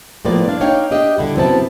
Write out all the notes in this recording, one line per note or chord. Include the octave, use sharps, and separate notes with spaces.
A2 F3 A#3 B3 B4 D5
G2 D4 F5
A#3 D4 D#4 C#5 F5 G5
D4 G4 D#5 E5 G5
D3 G3 E4
F#2 C3 B3 C4 E4 A5